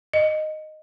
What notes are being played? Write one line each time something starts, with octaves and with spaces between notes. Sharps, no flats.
D#5